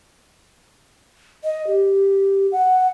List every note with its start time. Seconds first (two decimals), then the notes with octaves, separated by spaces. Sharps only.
1.44 D#5
1.67 G4
2.52 F#5